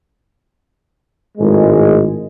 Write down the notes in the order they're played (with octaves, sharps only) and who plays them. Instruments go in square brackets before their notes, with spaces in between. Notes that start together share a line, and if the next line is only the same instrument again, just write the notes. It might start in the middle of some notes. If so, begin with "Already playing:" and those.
[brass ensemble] G#1 A2 G#3